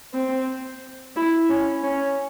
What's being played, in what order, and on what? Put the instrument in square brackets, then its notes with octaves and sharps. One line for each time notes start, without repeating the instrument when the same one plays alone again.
[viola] C4
E4
C#4
C#4